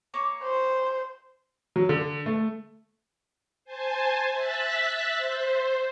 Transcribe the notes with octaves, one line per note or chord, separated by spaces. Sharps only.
A#3 C#5 D6
C5
F#3
D3
A3
C5 G#5 A5
E5 F#6 A6 B6
C5